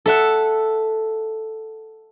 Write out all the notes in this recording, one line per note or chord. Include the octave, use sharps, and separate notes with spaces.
A4 E5 F#5